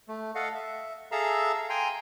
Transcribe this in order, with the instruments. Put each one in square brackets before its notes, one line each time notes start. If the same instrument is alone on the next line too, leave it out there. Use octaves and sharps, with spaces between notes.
[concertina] A3
A4 D#5 F5 F#5
E5
G#4 A4 E5 F5 A#5 E6
G5 G#5 A#5 C6